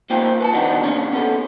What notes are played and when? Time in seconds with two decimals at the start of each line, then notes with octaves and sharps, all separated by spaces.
0.10 A#3 D#4 F4 C5 G5
0.41 B4 G#5 A5
0.53 B2 D#3 E3 D4 D#4 F#4
0.83 A#2 C#3 C#4 D4
1.12 B3 C#4 D#4 F#4 A4